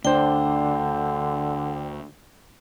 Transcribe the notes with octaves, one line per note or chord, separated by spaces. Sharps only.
D2 D3 D4 C5 G5